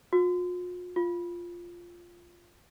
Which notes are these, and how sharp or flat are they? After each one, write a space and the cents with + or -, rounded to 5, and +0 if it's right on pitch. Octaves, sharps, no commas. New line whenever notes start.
F4 +45
F4 -5